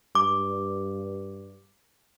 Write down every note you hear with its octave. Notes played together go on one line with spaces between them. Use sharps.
G2 D6